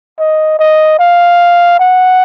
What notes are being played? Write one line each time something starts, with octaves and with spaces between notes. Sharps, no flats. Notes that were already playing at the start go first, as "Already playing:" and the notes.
D#5
D#5
F5
F#5